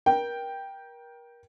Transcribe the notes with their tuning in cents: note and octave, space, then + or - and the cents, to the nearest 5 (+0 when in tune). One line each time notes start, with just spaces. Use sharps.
A#4 +30 G5 +0